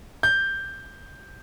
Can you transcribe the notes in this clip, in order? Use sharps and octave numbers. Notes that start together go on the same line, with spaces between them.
G6